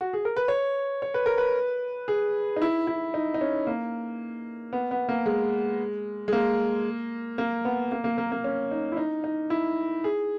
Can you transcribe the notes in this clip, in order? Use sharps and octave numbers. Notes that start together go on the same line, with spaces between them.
F#4
G#4
A#4
B4
C#5
C#5
B4
A#4
B4
G#4
D#4
E4
E4
D#4
D#4
C#4
A#3
B3
B3
A#3
G#3
G#3
A#3
A#3
B3
A#3
A#3
A#3
A#3
C#4
D#4
E4
D#4
D#4
E4
G#4